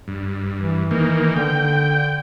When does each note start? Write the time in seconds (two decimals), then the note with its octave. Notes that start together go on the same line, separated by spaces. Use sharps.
0.08 G2
0.60 E3
0.91 D#3 A#3
1.36 D3 G5